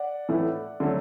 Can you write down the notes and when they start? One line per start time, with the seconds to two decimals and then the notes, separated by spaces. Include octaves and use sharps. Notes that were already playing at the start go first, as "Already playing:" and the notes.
Already playing: D5 F#5
0.29 A2 E3 A3
0.80 D3 F#3 A3